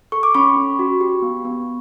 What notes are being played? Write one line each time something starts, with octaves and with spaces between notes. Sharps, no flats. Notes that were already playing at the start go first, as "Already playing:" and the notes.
A4 C#6
D6
C#4 B5 C#6
C#4
F#4
G4
B3
B3